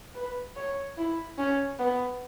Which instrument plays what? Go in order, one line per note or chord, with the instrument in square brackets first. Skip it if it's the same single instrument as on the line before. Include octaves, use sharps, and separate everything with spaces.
[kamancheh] B4
C#5
E4
C#4
B3